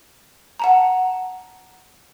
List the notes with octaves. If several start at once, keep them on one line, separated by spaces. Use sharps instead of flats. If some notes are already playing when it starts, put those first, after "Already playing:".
F#5 A5 A#5